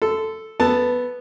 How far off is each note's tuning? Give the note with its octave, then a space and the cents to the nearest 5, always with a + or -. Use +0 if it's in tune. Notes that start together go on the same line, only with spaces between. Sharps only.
A4 +0 C6 -30
B3 +0 A4 +0 A5 +0